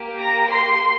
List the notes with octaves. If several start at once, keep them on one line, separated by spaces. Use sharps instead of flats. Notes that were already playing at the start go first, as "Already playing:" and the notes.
Already playing: A#3 G4
A#5 A#6
C6 C7